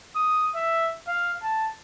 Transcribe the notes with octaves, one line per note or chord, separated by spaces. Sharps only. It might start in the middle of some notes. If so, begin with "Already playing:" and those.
D#6
E5
F5
A5